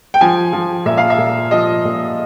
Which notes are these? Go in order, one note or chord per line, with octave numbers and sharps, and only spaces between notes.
G5
F3 G#5
F3
A#2 E5
F5
E5
A#2
F3 D#5
A#2